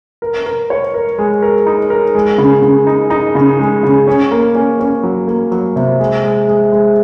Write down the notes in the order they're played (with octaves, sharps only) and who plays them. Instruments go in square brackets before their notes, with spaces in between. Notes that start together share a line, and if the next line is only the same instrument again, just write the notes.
[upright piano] A#4
A#4
C#5
A#4
G#3
A#4
D#4
A#4
G#3
C#3
C#3
D#4
D#4
C#3
G#3
C#3
C#4
A#3
C#4
C#4
F#3
A#3
F#3
C3
G#3
G#3
G#3
G#3